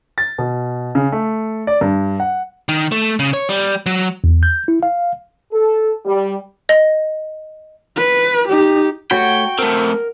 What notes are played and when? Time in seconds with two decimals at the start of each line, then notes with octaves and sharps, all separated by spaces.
0.18 A6
0.38 B2
0.95 C#3
1.12 A3
1.67 D5
1.81 G2
2.20 F#5
2.69 D#3
2.92 A3
3.19 C#3
3.33 C#5
3.49 G3
3.86 F#3
4.24 E2
4.43 G6
4.68 E4
4.83 F5
5.52 A4
6.05 G3
6.69 D#5
7.97 B4
8.48 D#4 G4
9.11 A3 F#4 C#5 G5 B5
9.59 A3 C4 A#4